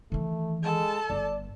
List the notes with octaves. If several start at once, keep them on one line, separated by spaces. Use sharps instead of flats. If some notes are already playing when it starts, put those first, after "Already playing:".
D#3 E3 A3
G#3 A4 A5
G1 D5